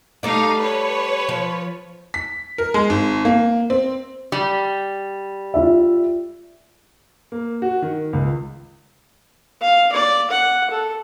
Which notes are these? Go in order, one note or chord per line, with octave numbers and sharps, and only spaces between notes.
G3 A3 D#4 D5 F5
B4 C#5
F3
B6
A#4
G#3
G#1
A#3
C4
G3
F4 E5
A#3
F#4
D#3
C#2
F5
D5
F#5
A4